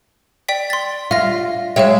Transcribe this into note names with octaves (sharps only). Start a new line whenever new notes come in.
D5 G5 B6
C6 A6
F4 E5 A#6
G#3 C#5 E5 F5 G5